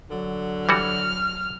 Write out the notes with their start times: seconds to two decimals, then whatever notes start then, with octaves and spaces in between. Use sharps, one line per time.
0.11 D3 F#3
0.69 E3 G3 F#4 F6